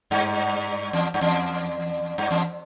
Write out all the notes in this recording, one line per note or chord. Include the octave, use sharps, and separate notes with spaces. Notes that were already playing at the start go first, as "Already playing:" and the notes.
G2
E2
G2
E2
G2
E2